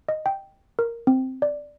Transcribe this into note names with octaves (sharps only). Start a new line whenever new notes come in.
D#5
G5
A#4
C4
D5